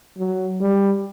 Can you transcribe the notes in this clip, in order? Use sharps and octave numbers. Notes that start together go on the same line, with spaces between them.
F#3
G3